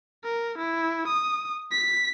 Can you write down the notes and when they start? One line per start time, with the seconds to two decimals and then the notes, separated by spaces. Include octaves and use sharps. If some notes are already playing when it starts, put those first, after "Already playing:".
0.24 A#4
0.58 E4
1.08 D#6
1.71 B6